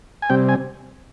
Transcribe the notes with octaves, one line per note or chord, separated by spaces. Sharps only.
G#5
C3 G3 C4 G5
G#5